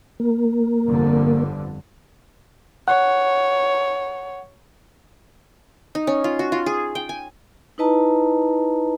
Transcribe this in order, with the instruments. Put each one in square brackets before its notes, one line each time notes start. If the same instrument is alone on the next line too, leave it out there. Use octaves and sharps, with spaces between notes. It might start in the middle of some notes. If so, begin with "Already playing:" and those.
[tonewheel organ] A#3
[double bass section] G1 F2 D3
[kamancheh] C#5 [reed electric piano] F#5
[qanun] D#4
C#4
F4
F#4
F4
G#4
G5
G#5
[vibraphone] D#4 E4 B4 D#5 A5 A#5